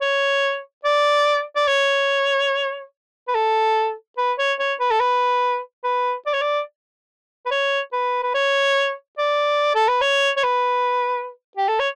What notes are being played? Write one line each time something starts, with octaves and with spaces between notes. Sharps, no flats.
C#5
D5
D5
C#5
B4
A4
B4
C#5
C#5
B4
A4
B4
B4
D5
C#5
D5
B4
C#5
B4
B4
C#5
D5
A4
B4
C#5
C#5
B4
G4
A4
C#5